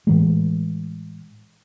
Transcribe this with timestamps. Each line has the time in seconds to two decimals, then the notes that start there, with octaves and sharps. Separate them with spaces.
0.07 A2 E3 G#3